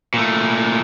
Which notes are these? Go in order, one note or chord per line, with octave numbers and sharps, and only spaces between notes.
A#2 A3